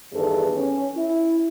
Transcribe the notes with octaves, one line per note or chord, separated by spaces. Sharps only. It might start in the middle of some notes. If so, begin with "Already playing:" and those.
E2 G2 D#3 G#4 A4 B4
C#4
E4